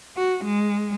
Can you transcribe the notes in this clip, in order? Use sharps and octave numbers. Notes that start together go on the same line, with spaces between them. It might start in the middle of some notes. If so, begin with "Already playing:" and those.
F#4
G#3